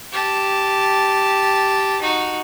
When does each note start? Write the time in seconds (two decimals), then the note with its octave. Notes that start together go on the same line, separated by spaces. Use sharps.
0.12 G4 A5
2.01 D#4 F#4